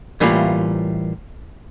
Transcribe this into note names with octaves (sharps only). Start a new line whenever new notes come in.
A2 E3 G3 A#3 F4